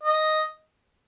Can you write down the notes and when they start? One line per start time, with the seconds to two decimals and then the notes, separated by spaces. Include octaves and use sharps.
0.03 D#5